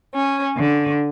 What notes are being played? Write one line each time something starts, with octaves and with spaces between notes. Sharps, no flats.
C#4
D3